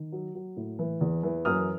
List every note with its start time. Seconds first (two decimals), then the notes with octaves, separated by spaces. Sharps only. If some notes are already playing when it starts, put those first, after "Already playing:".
Already playing: D#3
0.12 F#3
0.35 F#3
0.57 A2
0.79 E3
1.01 E2
1.23 E3
1.45 F#2 D#6 F6